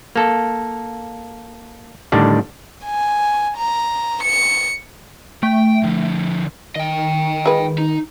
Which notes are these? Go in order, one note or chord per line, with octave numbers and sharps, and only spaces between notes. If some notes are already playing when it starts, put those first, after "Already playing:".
A#3 A4
A2 D3 D#3 G3 D4
G#5
A#5
C#7
A3 G5
D3 F3
D#3 D#5 G5
G#3 F4 B4
D#4